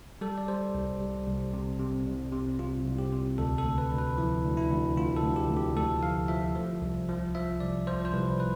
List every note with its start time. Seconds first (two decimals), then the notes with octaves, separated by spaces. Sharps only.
0.21 G3 A4
0.38 D5
0.48 G3 C5
0.75 C2
1.00 G3
1.27 C2
1.53 C3
1.79 C3
2.06 C2
2.32 C3
2.59 C3 F4
2.85 C2
2.99 G4
3.13 C3
3.38 D2 A4
3.58 A4
3.65 D2
3.78 B4
3.92 D2
3.98 B4
4.17 F3 E4
4.44 D2
4.57 E4
4.70 D2
4.97 D2 F4
5.16 A4
5.23 D2
5.36 G4
5.49 D2
5.57 G4
5.76 D2 A4
6.03 F3 F5
6.28 F3 E5
6.56 F3
6.82 C2
7.09 F3
7.35 F3 E5
7.60 C2 D5
7.87 F3 C5
8.05 C5
8.14 C2 B4
8.40 B4